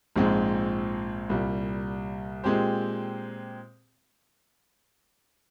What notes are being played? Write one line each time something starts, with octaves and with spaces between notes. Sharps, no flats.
A#1 G#2 F3 G#3 C4
C2 A#2 G3
A#2 G#3 C4 G4 C5